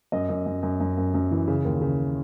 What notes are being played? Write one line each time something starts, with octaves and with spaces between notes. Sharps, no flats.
F#2 D#5
F#2
F#2
F#2
F#2
F#2
F#2
E3
C#3
D#2
C#3